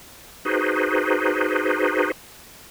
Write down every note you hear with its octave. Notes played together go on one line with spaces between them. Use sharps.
D#4 F#4 G#4 B4 C5